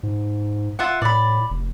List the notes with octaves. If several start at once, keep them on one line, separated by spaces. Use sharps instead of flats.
G#2
F4 E5 F#5
A2 D5 B5
F1